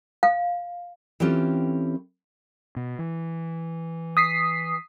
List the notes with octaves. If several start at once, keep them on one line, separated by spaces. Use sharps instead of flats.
F5
E3 C4 C#4 F4 G4 A4
B2
E3
D#6 B6 C7